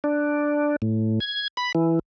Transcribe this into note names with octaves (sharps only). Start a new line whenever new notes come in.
D4
A2
G#6
B5
E3